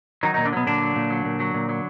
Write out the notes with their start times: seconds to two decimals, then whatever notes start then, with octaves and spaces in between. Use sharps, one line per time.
0.23 D#3 F#3 D#4
0.34 A#2 D#3 D#4
0.45 D3 D4
0.53 B2 F#3 B3
0.67 A#2 D3 D4
0.81 F#3
0.96 A#2
1.10 F#3
1.25 A#2
1.40 F#3
1.54 A#2
1.69 F#3